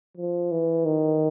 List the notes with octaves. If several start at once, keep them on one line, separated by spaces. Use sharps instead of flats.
F3
E3
D#3